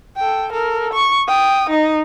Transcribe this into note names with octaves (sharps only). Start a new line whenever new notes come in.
A4 G5
A4 A#4
C#6
G5 D#6
D#4 D#5